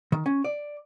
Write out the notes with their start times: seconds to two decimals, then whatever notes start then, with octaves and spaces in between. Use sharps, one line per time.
0.12 D#3
0.26 C#4
0.44 D5